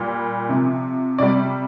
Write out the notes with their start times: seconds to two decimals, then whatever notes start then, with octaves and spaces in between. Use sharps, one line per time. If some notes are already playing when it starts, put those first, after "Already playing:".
Already playing: A#2 G3
0.49 C3 F3
1.18 C3 G3 D5